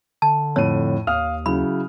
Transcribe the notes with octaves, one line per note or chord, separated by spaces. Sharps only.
D3 A5
F2 A2 C#5 D#7
D#2 F5 D#6 F6
C#3 F#3 E4 B5